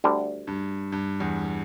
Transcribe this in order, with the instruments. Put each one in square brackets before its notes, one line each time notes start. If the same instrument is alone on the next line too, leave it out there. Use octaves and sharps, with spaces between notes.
[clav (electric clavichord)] D2 D3 G3
[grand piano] G2
G2
E2